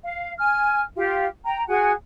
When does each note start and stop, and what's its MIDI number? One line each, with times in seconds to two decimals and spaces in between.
0.03 0.32 77
0.37 0.80 80
0.37 0.80 89
0.95 1.24 65
0.95 1.24 67
1.43 1.62 79
1.43 1.62 82
1.68 1.91 66
1.68 1.91 68
1.68 1.91 78
1.68 1.91 80